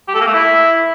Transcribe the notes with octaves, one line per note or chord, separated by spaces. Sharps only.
G4
A4
A#3
A3
E4